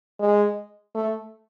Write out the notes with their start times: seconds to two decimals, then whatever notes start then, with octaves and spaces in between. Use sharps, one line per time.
0.19 G#3
0.95 A3